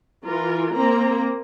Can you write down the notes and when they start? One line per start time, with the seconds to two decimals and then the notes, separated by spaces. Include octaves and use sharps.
0.24 E3 F4 A#4
0.73 A#3 C4 A#5